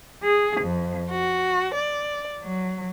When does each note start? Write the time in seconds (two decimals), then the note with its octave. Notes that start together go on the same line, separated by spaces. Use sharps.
0.24 G#4
0.63 F2
1.11 F#4
1.74 D5
2.44 F#3